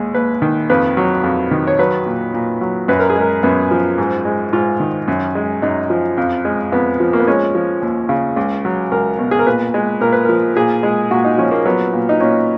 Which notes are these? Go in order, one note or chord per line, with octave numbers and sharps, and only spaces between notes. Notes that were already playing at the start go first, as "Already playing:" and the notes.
Already playing: D#2 G#3
D#2 B4
D#3
F2 B4
F#3
F2
D#3
C#5
F#3 B4
A#2
A#2
F#3
F#2 B4
A#4
G#4
G#3
A#4
F#2 B3
F3
G#2
G#3
G#2 F4
D#3
F#2
G#3
F#2 D#4
F3
F2
G#3
F2 B3
F3
A#3
B3
G#3 C#4
F3
D#2
C#3
C#2
F#3
C#2 A#4
B2
G#4
A#4
A#2 B4
G#3
A#2 A#4
B4
F3 A#4
A#2 G#4
G#3
A#2 F#4
D#4
F3 C#4
A#3
F#3 B3
A#2
D#4
A#2 C#4